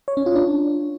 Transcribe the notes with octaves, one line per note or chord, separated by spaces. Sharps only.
C#5
C#4
F4
D4